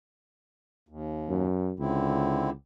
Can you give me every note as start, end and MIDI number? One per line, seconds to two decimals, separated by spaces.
0.89 1.47 39
1.29 1.74 42
1.79 2.52 37
1.79 2.50 50
1.79 2.50 60
1.79 2.50 64